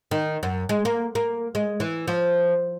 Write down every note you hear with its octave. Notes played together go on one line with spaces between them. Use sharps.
D#3
F#2
G#3
A#3
A#3
G#3
E3
F3